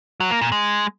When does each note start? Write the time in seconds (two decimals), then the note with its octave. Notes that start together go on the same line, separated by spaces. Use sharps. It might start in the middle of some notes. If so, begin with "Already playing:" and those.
0.20 F#3
0.31 A#3
0.41 A#2
0.52 G#3